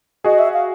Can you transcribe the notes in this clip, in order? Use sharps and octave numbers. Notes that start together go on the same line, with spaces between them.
F#4 G#4 D#5
E5
F5